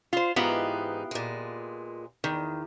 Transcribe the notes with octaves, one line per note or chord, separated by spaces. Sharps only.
F4 C5
G#2 E3 B3 D#4 F4 G4
A#2 G#3
E2 D#3